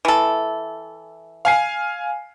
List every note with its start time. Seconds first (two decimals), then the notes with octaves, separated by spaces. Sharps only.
0.05 E3 A4
1.45 F5 G#5 C7